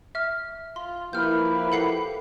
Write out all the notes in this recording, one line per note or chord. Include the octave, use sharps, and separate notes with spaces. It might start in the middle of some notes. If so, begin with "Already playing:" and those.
E5 F6
F4 C6
F3 A#3 E4 G4 B4 F6 G6
A4 F#5 C7